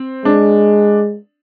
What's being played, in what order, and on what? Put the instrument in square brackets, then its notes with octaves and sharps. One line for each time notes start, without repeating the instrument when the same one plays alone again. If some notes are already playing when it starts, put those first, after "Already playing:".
Already playing: [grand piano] C4
[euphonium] G#3 [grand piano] D4